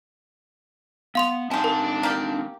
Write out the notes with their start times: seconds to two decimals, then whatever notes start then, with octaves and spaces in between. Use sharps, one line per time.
1.15 B3 F5 C6 F7
1.51 G#3 C4 D4 D#4 G4 F5 A5
1.64 A#4
2.03 A#3 G4